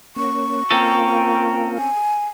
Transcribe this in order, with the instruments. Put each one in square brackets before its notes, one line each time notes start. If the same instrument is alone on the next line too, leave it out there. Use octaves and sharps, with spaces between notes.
[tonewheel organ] A#3 C#4 [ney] C#6
[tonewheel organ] A#3 F4 [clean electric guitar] C4 C#4 A4 [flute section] G5 A#5
[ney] G#5